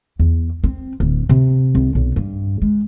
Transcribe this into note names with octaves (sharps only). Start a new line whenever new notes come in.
E2
C4
D1
C3
C2
B1
G2
G#3